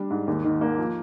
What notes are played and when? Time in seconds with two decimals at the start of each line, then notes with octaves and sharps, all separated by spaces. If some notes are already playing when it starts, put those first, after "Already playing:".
Already playing: G3 D4
0.10 G#2
0.28 D#2
0.45 D#3
0.61 A#3
0.78 F3